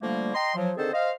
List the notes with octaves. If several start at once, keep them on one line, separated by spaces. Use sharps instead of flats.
D3 F3 G3 A3 A#3
D#5 G5 A#5 C6
F3 F#3
D3 D#3 C4 G#4 A4 C5
C5 D#5 F5